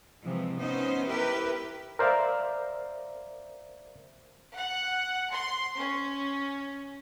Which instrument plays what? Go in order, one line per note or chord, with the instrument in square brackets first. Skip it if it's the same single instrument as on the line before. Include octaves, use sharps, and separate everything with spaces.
[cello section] C3 E3 F3 G#3
B3 C#4 D#4 C5
E4 G4 A#4 B4
[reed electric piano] A#4 C5 D5 E5 F5
[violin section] F#5
C6
C#4